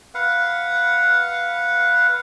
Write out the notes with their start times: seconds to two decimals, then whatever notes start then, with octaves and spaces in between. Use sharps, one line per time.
0.15 B4 F5 F#5